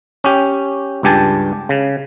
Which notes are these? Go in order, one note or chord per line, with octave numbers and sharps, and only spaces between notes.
C#4 G4
C#2 G2 G4 G#5 A5
C#3